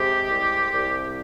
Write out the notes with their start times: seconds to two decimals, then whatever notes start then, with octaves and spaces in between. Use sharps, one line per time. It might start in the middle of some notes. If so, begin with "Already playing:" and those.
Already playing: C3 G#3 G4
0.30 C2
0.73 C2